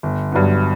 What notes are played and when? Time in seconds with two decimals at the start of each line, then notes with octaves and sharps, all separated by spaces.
0.03 G1
0.32 G2 F#3 B3